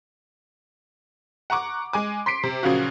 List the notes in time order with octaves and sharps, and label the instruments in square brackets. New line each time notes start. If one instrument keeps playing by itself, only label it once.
[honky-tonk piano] F#5 A#5 C#6 D6
G#3 G#5 D6
C6 B6 C7 D7
C3
A#2 C#3 F3 F#3 F4 F#4